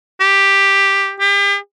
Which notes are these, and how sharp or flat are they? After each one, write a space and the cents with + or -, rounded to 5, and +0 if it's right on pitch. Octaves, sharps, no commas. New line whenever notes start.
G4 +5
G4 +40